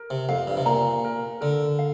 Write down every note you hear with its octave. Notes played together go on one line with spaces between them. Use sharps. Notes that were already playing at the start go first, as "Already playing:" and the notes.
Already playing: A#4
C3
F2 F5
G2
C3
A#2 A#5
A#4
D3 A#4
F5